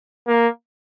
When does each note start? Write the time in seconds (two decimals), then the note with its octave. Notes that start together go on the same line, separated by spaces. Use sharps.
0.28 A#3